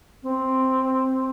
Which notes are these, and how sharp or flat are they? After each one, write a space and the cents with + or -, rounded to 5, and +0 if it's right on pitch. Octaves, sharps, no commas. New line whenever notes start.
C4 +0